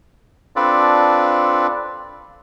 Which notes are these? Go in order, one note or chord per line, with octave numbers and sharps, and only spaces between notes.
C4 D4 F4 A4 B4 D5